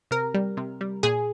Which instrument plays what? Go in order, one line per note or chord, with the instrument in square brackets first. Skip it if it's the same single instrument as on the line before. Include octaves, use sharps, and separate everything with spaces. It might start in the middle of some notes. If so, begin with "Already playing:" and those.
[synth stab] C3 A#4
G3
C3
G3
A#2 G#4